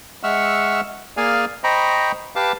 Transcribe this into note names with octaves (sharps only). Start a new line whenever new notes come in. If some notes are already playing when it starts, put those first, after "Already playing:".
G#3 E5 F#5 C#6 E6 F6
A#3 G#4 D5 F5 G#5 F6
C5 D#5 G5 A#5 B5 C#6
G4 B4 F5 A5 D6